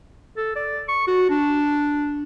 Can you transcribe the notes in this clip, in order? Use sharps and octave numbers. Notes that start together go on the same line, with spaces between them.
A4
D5
C#6
F#4
D4